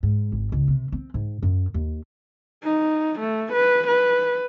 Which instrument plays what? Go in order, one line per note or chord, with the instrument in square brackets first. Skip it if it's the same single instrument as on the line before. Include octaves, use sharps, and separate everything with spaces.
[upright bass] G#2
G#1
C#2
C3
C4
G#2
F#2
D#2
[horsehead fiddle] D#4
A3
B4
B4